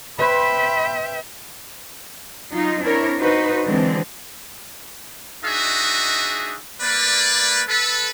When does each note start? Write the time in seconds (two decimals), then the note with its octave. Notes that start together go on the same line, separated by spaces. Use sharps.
0.19 B4 C5 E5 G5 B5
2.51 F#3 D#4 F4
2.82 C4 D4 E4 A#4 C#5
3.18 D#4 F#4 B4 C5
3.65 D3 E3 F#3 G#3 C4
5.43 D4 D#4 F#4 G#4 D#5 E5
6.81 A#3 B4 D5
7.68 A4 B4